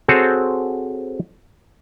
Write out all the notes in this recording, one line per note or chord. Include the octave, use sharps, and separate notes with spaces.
C4 F#4 G#4 A4 C5 C#5